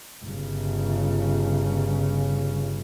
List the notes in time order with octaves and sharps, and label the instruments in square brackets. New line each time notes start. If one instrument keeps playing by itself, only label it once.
[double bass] G1 C#3